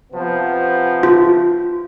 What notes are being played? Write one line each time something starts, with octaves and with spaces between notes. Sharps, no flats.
C3 F3 B3
F4